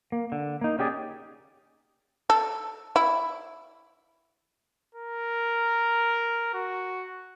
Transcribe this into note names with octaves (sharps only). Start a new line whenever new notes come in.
A#3
D3
A#3 D#4
C#4 G4 G#4 D5
A4
E4
A#4
F#4